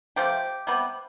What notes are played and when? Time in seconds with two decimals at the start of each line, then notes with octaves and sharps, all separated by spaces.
0.16 C3 F3 A3 G4
0.67 C3 G3 B3